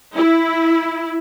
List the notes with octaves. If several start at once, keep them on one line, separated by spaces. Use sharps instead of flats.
E4